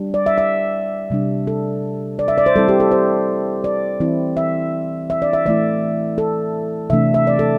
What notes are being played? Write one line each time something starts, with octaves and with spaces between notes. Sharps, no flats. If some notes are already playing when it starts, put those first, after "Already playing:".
Already playing: G3 D4
D5
E5
E5
C3 G3 D4
A4
D5
E5
D5
C5
G3 C4 E4 A4
G4
A4
C5
D5
E3 C4 E4
E5
E5
D5
E5
E3 A3 E4 D5
A4
C3 E3 A3 D4 E5
E5
D5
A4